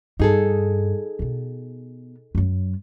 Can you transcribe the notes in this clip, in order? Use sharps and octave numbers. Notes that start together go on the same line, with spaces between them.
G2 D#4 G#4 A4
B2 B3
F#2 F#3